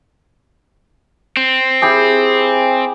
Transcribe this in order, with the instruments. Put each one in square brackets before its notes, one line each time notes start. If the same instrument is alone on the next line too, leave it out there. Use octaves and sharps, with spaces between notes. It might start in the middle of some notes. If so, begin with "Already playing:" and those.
[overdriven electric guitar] C4
[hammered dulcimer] E4 G4 G#4